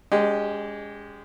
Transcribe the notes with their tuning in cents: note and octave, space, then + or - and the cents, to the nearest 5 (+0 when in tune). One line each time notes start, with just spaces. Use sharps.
G#3 -15 C#4 +45 G4 -10